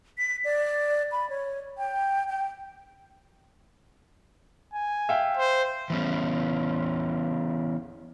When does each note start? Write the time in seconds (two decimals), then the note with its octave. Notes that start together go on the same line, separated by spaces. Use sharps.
0.18 B6
0.44 D5
1.12 B5
1.30 C#5
1.78 G5
2.28 G5
4.73 G#5
5.09 E5 F5 G5
5.37 C5
5.90 E3 B3 C#4